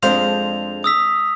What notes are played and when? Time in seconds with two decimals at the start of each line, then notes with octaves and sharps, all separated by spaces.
0.03 F2 G#3 C4 D4 C5 F5 F7
0.84 D#6 E6 B6